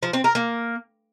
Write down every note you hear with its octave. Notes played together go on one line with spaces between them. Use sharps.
F3
C4
A#4
A#3